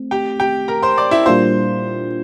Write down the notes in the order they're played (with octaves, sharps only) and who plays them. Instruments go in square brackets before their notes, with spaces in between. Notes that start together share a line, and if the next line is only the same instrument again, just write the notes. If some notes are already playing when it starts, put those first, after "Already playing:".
Already playing: [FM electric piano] A3 C4
[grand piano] G4 G5
G4 G5
A#4 A#5
C5 C6
D5 D6
E4 E5
[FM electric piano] A#2 G3 A#3 D4 F4 [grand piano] C5 C6